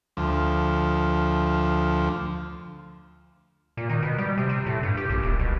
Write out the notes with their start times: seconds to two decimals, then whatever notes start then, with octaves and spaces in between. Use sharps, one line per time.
0.17 D2 F3
3.77 A#2
3.90 D#3
4.03 B2
4.18 G3
4.37 C3
4.49 C3
4.66 A2
4.83 G2
4.97 G4
5.10 A#1
5.23 D#1
5.39 B1